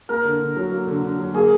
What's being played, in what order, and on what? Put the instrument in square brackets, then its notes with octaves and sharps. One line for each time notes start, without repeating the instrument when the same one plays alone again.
[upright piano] A#3 [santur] A#4
[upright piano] D3
D3
F#3
A#3
D3
D3
F#3
[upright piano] A#3 [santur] G#4